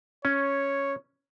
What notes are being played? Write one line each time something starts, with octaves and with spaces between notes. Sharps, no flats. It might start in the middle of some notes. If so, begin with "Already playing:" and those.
C#4 C#5